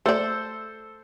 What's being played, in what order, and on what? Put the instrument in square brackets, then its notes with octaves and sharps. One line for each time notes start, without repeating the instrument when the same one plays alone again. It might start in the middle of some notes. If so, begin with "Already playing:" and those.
[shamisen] A3 D5 [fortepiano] A4 C5